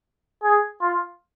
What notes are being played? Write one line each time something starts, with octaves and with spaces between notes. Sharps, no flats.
G#4
F4